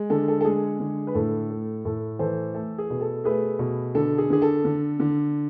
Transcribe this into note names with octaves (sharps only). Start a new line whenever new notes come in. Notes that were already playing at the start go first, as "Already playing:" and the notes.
Already playing: G#3
D3 A4
A4
A4
G#3 G#4
D3
B4
A2 A4
A3
A2 A4
E3 A4 C5
A3 A4
G#4
B2
A4
A3 G#4 B4
B2
D3 A4
G#4
D3 G#4
A4
D3
D3